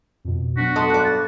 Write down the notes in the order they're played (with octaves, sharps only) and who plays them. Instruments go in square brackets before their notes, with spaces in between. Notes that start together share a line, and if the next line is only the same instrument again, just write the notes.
[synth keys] F2 B2
[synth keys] F#3 B3 D4 [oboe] F#4 [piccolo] B6
[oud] A4 D#5 [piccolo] C6
[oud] G2 D5 [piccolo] F#6
[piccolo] A6